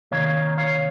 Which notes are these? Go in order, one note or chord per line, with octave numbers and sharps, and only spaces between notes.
C3 D#3 A#3 C#5 F5
C#5 F5